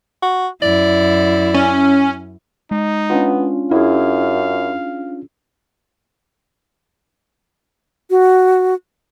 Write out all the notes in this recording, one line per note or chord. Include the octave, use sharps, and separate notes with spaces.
F#4
F#2 E4 D5
C#4
G#3 D#4
B3 C#4 D4 F4
F#2 E4 G#4 F5
F#4